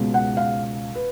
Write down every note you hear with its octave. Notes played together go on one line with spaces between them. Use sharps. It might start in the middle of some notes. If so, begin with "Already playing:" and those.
Already playing: C#2 B2 G#3
F#5
F5
B4